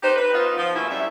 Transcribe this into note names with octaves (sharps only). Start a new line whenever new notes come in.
D#4 G4 B4 C5
B4
B3 D#4 F4
F3
B2 A#3 C#4 E4 G#4
F#2 G3 E5